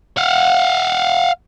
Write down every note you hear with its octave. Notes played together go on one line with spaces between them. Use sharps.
F5 F#5